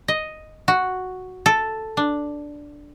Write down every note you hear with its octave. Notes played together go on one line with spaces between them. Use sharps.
D#5
F#4
A4
D4